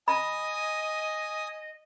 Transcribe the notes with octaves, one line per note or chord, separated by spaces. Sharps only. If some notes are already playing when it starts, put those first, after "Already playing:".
D#5 G#5 B5 D#6